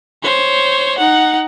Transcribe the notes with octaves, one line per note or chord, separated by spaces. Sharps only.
C5 C#5
D#4 F#5